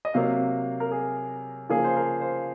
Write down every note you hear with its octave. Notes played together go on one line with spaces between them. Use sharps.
D#5
C3 F#3 A#3 F5
A#4
G#4
C#3 F3 A#3 G#4
C5
A#4
C5